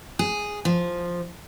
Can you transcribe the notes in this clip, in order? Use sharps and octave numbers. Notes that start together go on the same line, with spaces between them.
G#4
F3